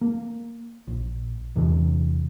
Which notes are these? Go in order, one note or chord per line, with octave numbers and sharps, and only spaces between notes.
A#3
A#1
E2 C3 E3